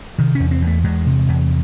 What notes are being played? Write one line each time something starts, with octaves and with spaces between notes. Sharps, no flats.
C3 D#3
E2 C#4
C4
E2
A3
E2 G#3
C3
E2